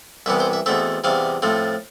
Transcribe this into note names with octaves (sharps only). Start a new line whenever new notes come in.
C2 C3 E3 B3 E5
C5
E5
E2 B2 A3 C4 E5
E2 C3 G3 C4 F5
A2 F3 A3 C4